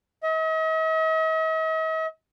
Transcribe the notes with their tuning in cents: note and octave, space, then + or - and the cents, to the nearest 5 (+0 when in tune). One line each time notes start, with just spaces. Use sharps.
D#5 +45